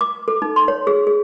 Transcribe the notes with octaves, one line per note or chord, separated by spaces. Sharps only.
D6
A4
D#4
C6
C#5
G#4
G#4